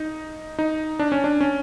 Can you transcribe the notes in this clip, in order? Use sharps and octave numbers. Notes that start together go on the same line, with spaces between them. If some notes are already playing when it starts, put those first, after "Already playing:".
Already playing: D#4
D#4
D4
C#4
D4
C#4